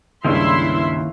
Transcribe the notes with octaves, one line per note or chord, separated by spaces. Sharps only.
C#2 G2 D#3 A#3 C#4 E4 E5 C6